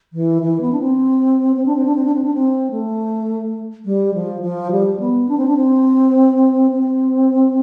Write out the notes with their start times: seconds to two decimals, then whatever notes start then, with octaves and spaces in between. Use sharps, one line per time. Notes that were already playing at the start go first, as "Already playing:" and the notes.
0.13 E3
0.42 E3
0.61 B3
0.72 D4
0.80 C4
1.56 C4
1.66 D4
1.75 C4
1.85 D4
1.95 C4
2.05 D4
2.14 C4
2.24 D4
2.34 C4
2.71 A3
3.85 G3
4.14 F3
4.42 F3
4.71 G3
5.00 B3
5.29 D4
5.38 C4
5.47 D4
5.57 C4
6.71 C4